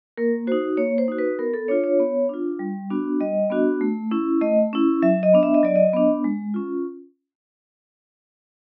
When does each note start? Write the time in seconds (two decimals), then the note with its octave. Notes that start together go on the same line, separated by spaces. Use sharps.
0.18 A#3 A#4
0.47 F#4 C5
0.52 D#4
0.77 A#3 C#5
0.98 C5
1.08 D#4 F#4
1.18 B4
1.39 B3 A#4
1.54 A4
1.68 D4 F4 C#5
1.84 C#5
1.99 B3
2.29 D4 F4
2.59 G3
2.90 B3 D4 F#4
3.21 G3 D#5
3.50 B3 D4 F#4
3.81 A3
4.11 C#4 E4
4.41 A3 D#5
4.73 C#4 E4
5.02 F#3 E5
5.23 D#5
5.33 B3 D4
5.43 E5
5.54 D#5
5.63 F#3 D5
5.76 D#5
5.93 B3 D4
6.24 G#3
6.54 C#4 F4